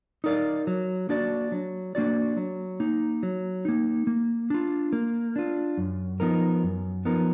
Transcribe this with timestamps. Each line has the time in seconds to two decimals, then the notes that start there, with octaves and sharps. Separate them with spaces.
0.24 D#4 A#4 D5 F5
0.67 F#3
1.09 A#3 D4 F#4 D5
1.52 F#3
1.95 A#3 D4 F#4 D5
2.37 F#3
2.80 A#3 D#4
3.23 F#3
3.65 A#3 D#4
4.07 A#3
4.50 D4 F4
4.93 A#3
5.36 D4 F4
5.78 F#2
6.20 F3 B3 D#4 A#4
6.63 F#2
7.05 F3 B3 D#4 A#4